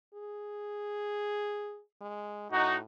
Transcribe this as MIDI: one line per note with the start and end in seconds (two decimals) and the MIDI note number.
0.14 1.81 68
2.01 2.47 56
2.51 2.82 45
2.51 2.76 63
2.51 2.76 66